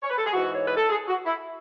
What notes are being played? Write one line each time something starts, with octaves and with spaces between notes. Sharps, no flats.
C#5
B4
A4
G#4
G#2 E3 F#4
C#5
B4
A4
G#4
F#4
E4